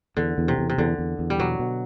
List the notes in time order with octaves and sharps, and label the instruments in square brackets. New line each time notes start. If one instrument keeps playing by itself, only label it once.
[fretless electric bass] E2 [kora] D3
[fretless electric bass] E2
[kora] C3
[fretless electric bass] E2
[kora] C3
[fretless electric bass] E2 [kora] D3
[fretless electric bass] E2
E2
[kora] G3
[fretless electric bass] B2 [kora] F#3
[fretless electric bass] B2